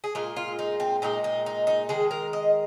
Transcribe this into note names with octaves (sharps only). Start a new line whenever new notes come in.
G#4
A#2 G#3 F4
F4
D#4
C4
A#2 G#3 D#4
D#4
D#4
D#4
D#3 G#3 G#4
A#4
D#5